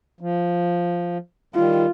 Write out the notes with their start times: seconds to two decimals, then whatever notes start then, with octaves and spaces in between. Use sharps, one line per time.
0.21 F3
1.55 D#3 G3 F4